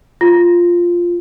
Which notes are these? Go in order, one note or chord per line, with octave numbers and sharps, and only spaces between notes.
F4